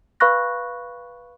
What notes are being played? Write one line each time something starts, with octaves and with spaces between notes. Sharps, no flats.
B4 F5 B5 C#6 F#6 A#6